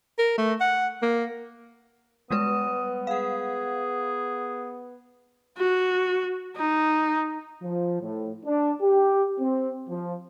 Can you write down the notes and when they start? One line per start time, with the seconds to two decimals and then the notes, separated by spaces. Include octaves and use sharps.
0.18 A#4
0.38 A3
0.60 F#5
1.02 A#3
2.31 G3 G#3 B3 B4 D#6
3.07 G#4 F5 F#5
5.58 F#4
6.57 D#4
7.63 F3
8.01 A2
8.46 D4
8.82 G4
9.39 C4
9.89 F3